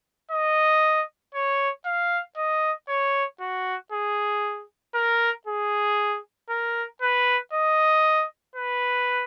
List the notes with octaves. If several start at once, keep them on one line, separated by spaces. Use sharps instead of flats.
D#5
C#5
F5
D#5
C#5
F#4
G#4
A#4
G#4
A#4
B4
D#5
B4